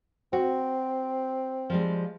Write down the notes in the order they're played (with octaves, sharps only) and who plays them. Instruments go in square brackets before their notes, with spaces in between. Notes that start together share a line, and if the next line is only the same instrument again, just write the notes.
[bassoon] C4 [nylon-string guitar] F#4
[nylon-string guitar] F3 G3 G#3